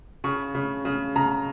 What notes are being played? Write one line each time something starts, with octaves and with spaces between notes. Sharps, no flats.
C#3 C#6
C#3
C#3
C#3 A#5